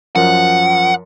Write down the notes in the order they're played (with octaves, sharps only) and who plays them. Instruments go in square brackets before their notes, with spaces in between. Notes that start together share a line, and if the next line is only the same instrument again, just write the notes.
[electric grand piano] F#2 F3 A#4 [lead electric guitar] F#5